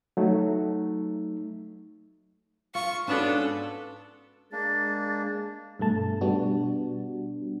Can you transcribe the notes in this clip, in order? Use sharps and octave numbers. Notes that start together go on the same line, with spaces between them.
F#3 A3 D#4
F4 C#6
G#2 B2 B3 C#4 D4 A4 B4
G#3 A#3 D4 A6
G2 B2 A3 A5
B2 G3 B3 D4 F#4